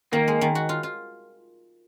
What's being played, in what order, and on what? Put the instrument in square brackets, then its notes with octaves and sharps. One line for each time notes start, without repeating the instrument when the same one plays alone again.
[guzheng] D#3 [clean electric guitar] A#3
[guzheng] G#3
D#3
F#4
F4
F4